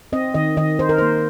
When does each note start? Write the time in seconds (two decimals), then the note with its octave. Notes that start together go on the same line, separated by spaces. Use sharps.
0.13 C4 D#5
0.34 D#3 D#5
0.57 D#3 D#5
0.79 D#4 C5
0.89 A#4
0.98 A#3 C5